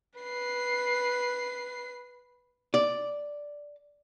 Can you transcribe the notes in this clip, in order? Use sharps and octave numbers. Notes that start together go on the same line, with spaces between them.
B4 C7
D5